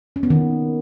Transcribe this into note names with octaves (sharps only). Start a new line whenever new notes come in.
C#4
B3
D#3